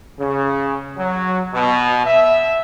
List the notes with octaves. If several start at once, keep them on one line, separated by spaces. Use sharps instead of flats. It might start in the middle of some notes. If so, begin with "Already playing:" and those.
C#3
F#3
B2
E5